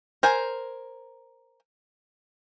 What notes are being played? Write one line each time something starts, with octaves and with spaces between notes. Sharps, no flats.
A#4 C5 G#5